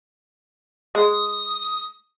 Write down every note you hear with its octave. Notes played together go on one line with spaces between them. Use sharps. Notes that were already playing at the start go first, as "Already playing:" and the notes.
G#3 D#6